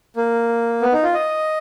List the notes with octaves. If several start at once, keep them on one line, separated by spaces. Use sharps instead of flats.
A#3
B3
D#4
F4
D#5